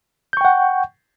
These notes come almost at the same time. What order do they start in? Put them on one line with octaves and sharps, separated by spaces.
G6 C#6 G5 F#5